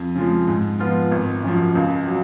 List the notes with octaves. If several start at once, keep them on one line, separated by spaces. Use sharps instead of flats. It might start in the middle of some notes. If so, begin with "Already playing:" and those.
Already playing: F2
C#3 F3 G#3
G#2
F3 B3 F4
G#1
F#2 F3
C#2
F#3